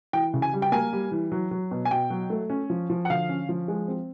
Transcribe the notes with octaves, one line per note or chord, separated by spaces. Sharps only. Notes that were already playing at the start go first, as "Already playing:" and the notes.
E3 G5
C#3
G#5
G3
G5
A#3 G#5
G3
E3
F#3
F#3
B2
G#5
B2 G5
F#3
A3
C#4
F3
F3
F#5
D3 F5
C#4
F3
G#3
C4